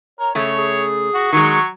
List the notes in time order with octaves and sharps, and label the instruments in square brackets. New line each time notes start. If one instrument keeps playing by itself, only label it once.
[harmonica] A#4 [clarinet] C#5
[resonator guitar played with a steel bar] C#3 A3 [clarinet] G#4 [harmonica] C#5
[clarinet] G#4
[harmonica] F#4
[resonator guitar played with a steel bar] D#3 G#3 [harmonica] F#3 [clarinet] C#6